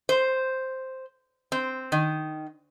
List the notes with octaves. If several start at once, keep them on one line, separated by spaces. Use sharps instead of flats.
C5
C4
D#3